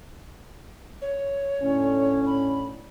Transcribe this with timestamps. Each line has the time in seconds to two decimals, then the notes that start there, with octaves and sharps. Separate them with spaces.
1.02 C#5
1.62 A2 D3 C#4
2.26 B5